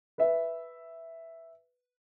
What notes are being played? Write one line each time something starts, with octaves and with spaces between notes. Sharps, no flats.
B4 E5